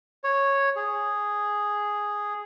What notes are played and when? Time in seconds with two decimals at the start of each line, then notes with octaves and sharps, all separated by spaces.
0.24 C#5
0.76 G#4